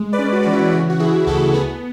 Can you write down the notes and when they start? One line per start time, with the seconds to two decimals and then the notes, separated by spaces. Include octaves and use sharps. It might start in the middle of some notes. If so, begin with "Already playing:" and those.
Already playing: G#3
0.13 B4 D5
0.19 C#4
0.32 F#4
0.43 E3 F#4
0.53 E4
0.73 C#3 F#4
0.90 F#4
0.99 E3 E4 G#4
1.26 D2 F#4 A4
1.53 B3 G#4 B4